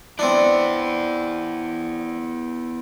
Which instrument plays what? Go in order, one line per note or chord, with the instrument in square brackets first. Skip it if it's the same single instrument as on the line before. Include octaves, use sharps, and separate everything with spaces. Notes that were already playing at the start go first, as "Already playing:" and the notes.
[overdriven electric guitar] B3 E4 [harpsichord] C4 D4